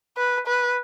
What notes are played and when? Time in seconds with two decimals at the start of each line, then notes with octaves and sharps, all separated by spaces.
0.17 B4
0.47 B4